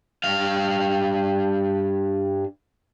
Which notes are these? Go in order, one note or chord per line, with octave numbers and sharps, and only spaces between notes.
G2 F5